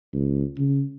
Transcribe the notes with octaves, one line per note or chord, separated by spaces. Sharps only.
C#2
C#3